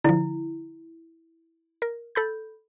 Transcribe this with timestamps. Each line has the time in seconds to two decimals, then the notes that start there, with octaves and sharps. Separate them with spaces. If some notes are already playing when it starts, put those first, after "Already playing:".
0.04 D3 F3 E4
1.82 A#4
2.15 A4 B5 G6